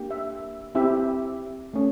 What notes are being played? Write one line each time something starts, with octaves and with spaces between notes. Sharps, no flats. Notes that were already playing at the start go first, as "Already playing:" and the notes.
Already playing: A#3 D4 G4
E5
C4 E4 G4 E5
A3 C#4